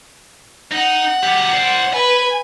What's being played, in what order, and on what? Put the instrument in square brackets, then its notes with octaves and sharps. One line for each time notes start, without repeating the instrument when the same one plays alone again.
[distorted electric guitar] D#4 [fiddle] F#5
[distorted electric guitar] F#3 G4
C5 D5
[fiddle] B4 [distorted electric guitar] G#5